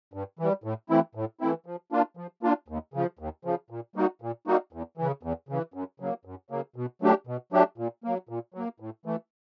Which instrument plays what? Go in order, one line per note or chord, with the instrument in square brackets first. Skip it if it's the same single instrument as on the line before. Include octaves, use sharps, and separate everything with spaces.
[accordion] G2
E3 G3
A2
E3 A3 C4 E4
A2
E3 A3 C4 E4
F3
A#3 D4 F4
F3
A#3 D4 F4
D#2
C#3 F3
D#2
C#3 F3
A#2
G3 A#3 D#4 F#4
A#2
G3 A#3 D#4 F#4
E2
C#3 E3
E2
C#3 E3
F#2
C#3 F#3 A#3
F#2
C#3 F#3 A#3
B2
F#3 A3 D4 G4
B2
F#3 A3 D4 G4
A#2
F#3 A#3
A#2
F#3 A#3
A2
E3 A3